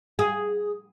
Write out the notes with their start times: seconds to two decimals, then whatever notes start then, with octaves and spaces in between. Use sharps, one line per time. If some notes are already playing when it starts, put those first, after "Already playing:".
0.19 G#4